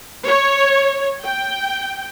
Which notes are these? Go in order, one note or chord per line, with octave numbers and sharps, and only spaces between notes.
C#5
G5